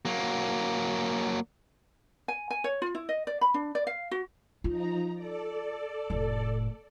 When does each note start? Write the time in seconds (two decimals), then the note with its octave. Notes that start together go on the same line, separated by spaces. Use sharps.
0.05 F#3 A#3
2.28 G#5
2.51 G#5
2.64 C#5
2.82 F4
2.95 E4
3.09 D#5
3.27 D5
3.41 B5
3.54 D4
3.75 D5
3.87 F5
4.11 F#4
4.64 F3 D#4 F4 A#5
5.14 A4 D5
6.10 F1 A2